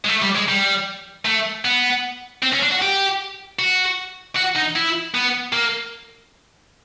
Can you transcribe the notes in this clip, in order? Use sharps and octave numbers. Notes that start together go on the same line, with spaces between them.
G#3
A3
G3
G#3
G3
A3
B3
C4
C#4
D4
F#4
G4
F#4
F#4
D#4
E4
B3
A#3